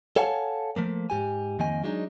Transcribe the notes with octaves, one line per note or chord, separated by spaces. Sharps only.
A4 C#5 F5 F#5 G#5 A5
F3 A3 A#3
G#2 G4 G#5
F2 D#3 A#3 D#5 G#5
F#3 G#3 D4 D#4